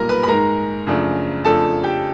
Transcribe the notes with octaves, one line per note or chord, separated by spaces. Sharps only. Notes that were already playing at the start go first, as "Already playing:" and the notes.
Already playing: B1 A#2 G3 A#3 A#4 A#5
B4 B5
B5
G#2 D#3 G#3 A#4 A#5
F#2 C#3 F3 A3 D4
F2 C#3 F3 A3 D4 A4 A5
G4 G5